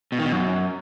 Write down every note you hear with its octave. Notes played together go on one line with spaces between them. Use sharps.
B2
D#3
B2
F#2